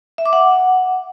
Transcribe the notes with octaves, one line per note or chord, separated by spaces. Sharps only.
E5
D6
F#5